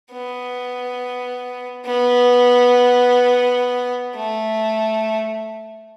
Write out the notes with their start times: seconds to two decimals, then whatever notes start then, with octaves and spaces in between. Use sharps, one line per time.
0.13 B3
1.86 B3
4.15 A3